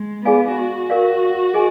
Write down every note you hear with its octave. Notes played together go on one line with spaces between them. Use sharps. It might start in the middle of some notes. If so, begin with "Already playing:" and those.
Already playing: G#3
B3 G#4 D5 F5 G#5
F#4
A#4 D5 F5
G#4 D#5 G#5